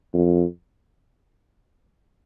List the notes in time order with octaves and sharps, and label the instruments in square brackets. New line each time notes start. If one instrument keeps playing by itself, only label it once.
[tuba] F2